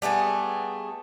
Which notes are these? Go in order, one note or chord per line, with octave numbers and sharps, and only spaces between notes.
G3 A3 B3 G#4